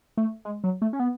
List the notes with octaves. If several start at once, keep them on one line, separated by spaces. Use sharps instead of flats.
A3
G#3
F#3
A3
C#4
B3